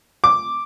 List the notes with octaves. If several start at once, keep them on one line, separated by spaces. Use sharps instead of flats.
D6